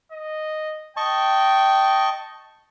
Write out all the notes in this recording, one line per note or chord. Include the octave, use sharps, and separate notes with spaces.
D#5
D#5 G5 A5 C#6